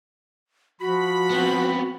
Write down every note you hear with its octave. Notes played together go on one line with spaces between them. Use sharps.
F3 F#4 B5
B3 C4